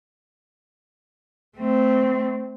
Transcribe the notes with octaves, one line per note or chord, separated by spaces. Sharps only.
A3 C4